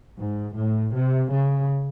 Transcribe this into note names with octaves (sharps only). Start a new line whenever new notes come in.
G#2
A2
C3
C#3